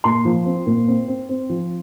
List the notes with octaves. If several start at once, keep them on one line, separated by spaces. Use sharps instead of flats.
A#2 C6
F3
C4
A#2
C4
C4
C4
F3